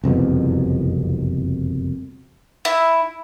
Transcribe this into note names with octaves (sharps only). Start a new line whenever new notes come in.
F#1 C2 F2 B2
E4